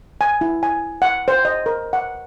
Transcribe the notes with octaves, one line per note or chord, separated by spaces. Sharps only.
G#5
E4
G#5
F#5
C5
D#5
A#4
F#5